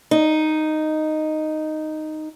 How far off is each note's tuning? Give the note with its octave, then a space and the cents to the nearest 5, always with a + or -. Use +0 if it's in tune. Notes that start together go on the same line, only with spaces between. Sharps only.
D#4 -5